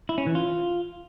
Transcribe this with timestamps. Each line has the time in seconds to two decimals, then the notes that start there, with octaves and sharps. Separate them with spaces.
0.09 E4
0.18 C#4
0.26 E3
0.35 F4